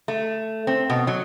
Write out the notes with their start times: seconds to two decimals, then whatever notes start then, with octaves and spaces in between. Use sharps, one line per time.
0.08 A3
0.67 C4
0.90 B2
1.07 F#3